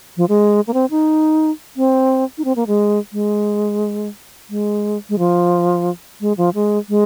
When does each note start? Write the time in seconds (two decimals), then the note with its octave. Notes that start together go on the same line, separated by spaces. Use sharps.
0.17 F3
0.29 G#3
0.67 A#3
0.74 C4
0.91 D#4
1.77 C4
2.38 D#4
2.45 C4
2.56 A#3
2.67 G#3
3.13 G#3
4.50 G#3
5.09 G#3
5.18 F3
6.21 G#3
6.37 F3
6.54 G#3
6.89 G#3